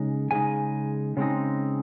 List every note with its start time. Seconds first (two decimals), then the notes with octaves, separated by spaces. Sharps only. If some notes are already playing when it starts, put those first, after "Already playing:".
Already playing: C#3 G#3 D#4
0.31 C#3 G#3 D#4 G#5
1.17 C#3 G#3 C4 D#4